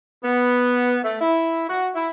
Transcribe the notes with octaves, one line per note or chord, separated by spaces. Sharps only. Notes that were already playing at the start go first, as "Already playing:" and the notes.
B3
A3
E4
F#4
E4